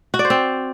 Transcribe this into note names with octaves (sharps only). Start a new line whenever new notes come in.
F#4
D5
C5
C4